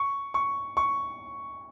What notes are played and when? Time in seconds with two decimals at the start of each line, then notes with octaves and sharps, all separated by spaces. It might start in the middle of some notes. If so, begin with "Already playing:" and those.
Already playing: C#6
0.34 C#6
0.77 C#6